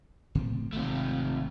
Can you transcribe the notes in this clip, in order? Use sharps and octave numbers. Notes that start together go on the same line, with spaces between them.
A2 F3 C4
G#1 C3 A3